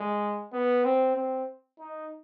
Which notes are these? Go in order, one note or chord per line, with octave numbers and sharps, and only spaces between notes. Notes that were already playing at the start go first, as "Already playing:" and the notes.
Already playing: G#3
B3
C4
C4
D#4